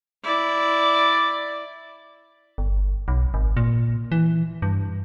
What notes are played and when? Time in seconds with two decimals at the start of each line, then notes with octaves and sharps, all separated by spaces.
0.24 E4 D5
2.58 G1
3.08 B1
3.34 G#1
3.57 A#2
4.12 E3
4.62 G2